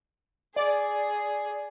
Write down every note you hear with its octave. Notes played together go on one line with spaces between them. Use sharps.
G#4 D5